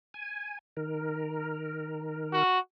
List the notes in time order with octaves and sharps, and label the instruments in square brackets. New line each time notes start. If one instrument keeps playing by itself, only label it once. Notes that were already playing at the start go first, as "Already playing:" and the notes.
[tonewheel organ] G#5
D#3 A#4
[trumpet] F#4